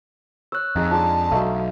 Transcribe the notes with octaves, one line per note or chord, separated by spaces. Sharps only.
C#5 E6 F#6
F2 D#4 G#4
G#3 D4 F4 A5
B1 A3 D#4 F#4 D#5 F5